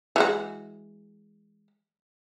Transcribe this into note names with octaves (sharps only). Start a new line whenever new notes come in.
E3 G#3 F#4